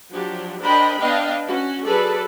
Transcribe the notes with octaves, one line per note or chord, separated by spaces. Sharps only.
F3 F#3 D4 F#4 G4
D4 A#4 C5 D#5 G5 B5
B3 D4 D#5 F5 G5
C#4 F#4
F#3 G#4 A4 B4 D5